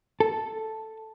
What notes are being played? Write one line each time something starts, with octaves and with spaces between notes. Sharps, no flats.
A4